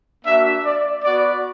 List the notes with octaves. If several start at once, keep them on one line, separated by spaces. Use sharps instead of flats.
A#3 D4 F#4 E5
D5
B3 F#4 D5